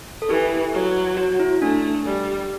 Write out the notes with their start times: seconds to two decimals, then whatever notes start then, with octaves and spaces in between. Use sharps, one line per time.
0.22 A4
0.29 E3 G4
0.73 F#3
1.17 F#4
1.40 E4
1.61 A3 D4
2.05 G3